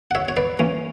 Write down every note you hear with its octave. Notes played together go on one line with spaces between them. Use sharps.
F#5
C#5 E5
C#5
B4 D5
E3 A#3 C#4